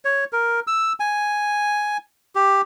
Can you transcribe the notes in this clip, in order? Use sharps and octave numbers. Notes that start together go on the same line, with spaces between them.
C#5
A#4
E6
G#5
G4